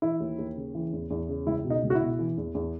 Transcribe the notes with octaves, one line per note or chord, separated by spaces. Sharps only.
E3 E4
D#2
D#2
C#3
E3
E2
E2
C#3
C#2 E4
B2
D#4
C#2
F#4
E4
B2
E3
E2
E2